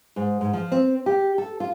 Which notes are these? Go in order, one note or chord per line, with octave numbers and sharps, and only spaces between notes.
G#2
G#2
F3
C4
G4
A4
F4